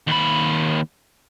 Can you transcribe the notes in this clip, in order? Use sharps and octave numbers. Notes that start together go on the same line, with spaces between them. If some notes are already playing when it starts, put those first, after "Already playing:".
D#2 B5